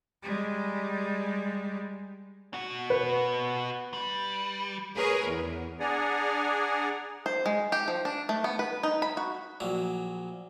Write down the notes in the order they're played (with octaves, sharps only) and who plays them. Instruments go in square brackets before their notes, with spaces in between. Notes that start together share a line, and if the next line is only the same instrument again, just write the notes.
[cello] G3 G#3
[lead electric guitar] B2 F#4
[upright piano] B4
[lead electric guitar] G3
[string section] G#4 A#4 B4 C#5
E2
[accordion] D4 G#4 D5 F#5 G#5 A#5
[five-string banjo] C5
G#3
G4
F3
D4
A3
B3
B4
D#4
B5
F#4
[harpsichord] A#1 F#3